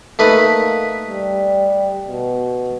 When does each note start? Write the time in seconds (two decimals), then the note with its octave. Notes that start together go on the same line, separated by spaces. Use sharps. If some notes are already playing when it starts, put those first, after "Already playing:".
0.19 A3 A#3 D#4 B4
1.05 G3
2.08 B2